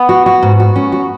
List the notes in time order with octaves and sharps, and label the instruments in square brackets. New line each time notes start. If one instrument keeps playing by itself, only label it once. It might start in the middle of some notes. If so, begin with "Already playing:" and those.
Already playing: [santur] B3
[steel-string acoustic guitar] F#4
F#4
G#2
F#4
C#4
F#4